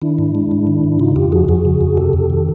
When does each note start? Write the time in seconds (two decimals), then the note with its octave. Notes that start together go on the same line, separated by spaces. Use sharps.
0.02 D#3 D4 E4
0.18 G#2
0.35 G#3
0.51 G#2
0.67 D#3
0.84 G#2
0.99 C#3 D#4 F4
1.16 F2 F4 G4
1.32 F3 F#4 G#4
1.48 F2 F#4 G#4
1.65 C#3
1.81 F2
1.97 C3 G4 A4
2.13 F2
2.30 D#3